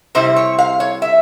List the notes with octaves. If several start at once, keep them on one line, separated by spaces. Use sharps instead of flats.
C3 G3 C4 E4 C5
C#5
F5
C#5
E5